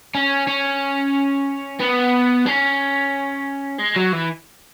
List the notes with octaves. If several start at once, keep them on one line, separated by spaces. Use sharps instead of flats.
C#4
C#4
B3
C#4
G#3
F#3
E3